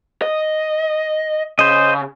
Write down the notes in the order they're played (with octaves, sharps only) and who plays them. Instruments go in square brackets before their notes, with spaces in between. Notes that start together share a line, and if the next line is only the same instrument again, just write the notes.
[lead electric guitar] D#5
[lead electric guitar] C#3 [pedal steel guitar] C5 D#5